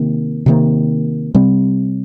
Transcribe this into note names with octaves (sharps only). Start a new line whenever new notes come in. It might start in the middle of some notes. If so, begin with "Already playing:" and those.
Already playing: C3 D#3 A#3
C3 D#3 A#3
C3 G3 C4